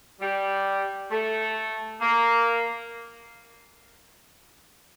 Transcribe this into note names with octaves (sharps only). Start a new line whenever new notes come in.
G3
A3
A#3